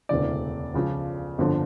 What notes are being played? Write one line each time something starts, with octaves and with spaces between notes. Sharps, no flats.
E1 D2 C#3 E3 D5
C#2 C#3 F3
G1 F2 D3 F3